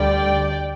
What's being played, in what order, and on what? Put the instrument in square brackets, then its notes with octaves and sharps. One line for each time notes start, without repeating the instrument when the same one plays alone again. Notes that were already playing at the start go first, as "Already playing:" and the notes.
Already playing: [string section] D2 D3 G3 D5 G5